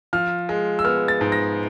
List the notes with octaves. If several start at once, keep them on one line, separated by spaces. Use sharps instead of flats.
F3 F6
G#3
E6
B3 F6
A6
G#2
A#6